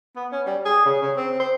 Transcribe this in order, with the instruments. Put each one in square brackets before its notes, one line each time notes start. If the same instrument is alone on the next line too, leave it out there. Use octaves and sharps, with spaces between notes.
[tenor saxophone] B3
C#4
G3
G#4
C#3
C#3
C4
C5